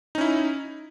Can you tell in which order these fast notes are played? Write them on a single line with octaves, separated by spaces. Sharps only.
D#4 C#4 E4